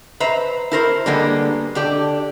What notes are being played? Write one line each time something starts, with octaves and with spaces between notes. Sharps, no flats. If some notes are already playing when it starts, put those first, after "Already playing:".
B4 C5 E5 A#5
E4 A#4 C5
D3 G3 G#3 A#3 B3
D3 G4 D5